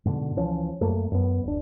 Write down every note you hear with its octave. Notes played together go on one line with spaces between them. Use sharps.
G#2 B2 D3
C#2 E3 F3 C#4
F#2 A3 A#3
F#2 B3
D1 D4